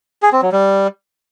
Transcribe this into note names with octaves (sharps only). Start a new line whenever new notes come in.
G#4
C4
F#3
G3